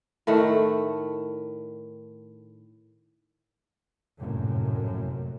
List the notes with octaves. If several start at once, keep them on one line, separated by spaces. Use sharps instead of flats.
A2 D#3 A3 F#5
F1 A#1 F#2 A2